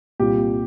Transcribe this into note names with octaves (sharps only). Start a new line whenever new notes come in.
C2 A#2 G3 G4